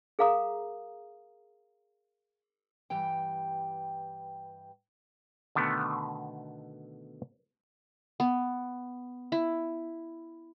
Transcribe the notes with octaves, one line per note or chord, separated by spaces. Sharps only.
G#4 A#4 F5 A#5 D#6
G2 E3 G4 G5
B2 D3 D#3 A3 B3
B3
E4